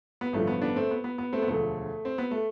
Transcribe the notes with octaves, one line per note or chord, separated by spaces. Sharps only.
B3
A1 G2 D3 F3 A3
B3
B3 D4
A3 C4
B3
B3
B3
A3 C4
B3
E1 D2 D3 F3 A3
C4
B3
A3